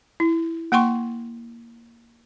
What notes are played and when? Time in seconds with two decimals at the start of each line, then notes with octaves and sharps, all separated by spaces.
0.20 E4
0.72 A#3 F#5 G5 C6 C#6